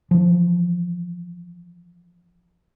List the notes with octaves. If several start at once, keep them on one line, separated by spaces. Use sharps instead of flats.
E3 F3